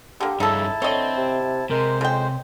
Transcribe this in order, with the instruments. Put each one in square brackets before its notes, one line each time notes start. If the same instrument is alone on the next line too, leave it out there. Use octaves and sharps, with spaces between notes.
[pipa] D3 A#3 [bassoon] G4
[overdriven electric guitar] G2 C#4 [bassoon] C#3 [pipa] D#4 A4 [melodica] E4 A5
[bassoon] D3 [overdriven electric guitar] C4 [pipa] C#5 D#5
[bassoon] C3
[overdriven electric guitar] C3 [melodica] G#3 C5 [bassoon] A#4
[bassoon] F2 [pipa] C#3 G5